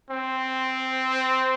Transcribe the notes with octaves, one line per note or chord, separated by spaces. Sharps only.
C4